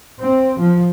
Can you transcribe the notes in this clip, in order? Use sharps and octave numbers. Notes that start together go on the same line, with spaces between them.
C4
F3